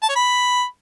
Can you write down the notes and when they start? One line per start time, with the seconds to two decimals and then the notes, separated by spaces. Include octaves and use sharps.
0.03 A5
0.09 C#5
0.16 B5